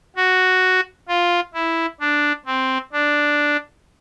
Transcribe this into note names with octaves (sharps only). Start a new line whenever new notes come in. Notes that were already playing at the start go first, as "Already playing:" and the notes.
F#4
F4
E4
D4
C4
D4